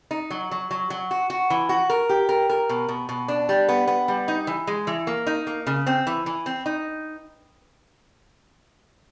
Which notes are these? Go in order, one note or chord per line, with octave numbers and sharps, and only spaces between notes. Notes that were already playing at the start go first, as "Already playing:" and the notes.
D#4
F#3
F#3
F#3
F#3
F#4
F#4
E3
F#4
A#4
G4
A#4
A#4
B2
B2
B2
D4
G3
B3
B3
G3
D#4
E3
G#3
E3
A#3
D#4
A#3
C#3
C4
E3
E3
C4
D#4